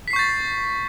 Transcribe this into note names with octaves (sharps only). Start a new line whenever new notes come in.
C#6 G6 A6 B6 C7